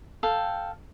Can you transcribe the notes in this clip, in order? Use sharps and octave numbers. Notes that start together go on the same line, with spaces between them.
A4 F5 G5